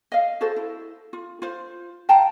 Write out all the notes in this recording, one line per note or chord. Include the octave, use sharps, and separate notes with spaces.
D#5 F5
F#4 G#4 A4 C5
E4
F4
F4 C5
F5 G5 A5 A#5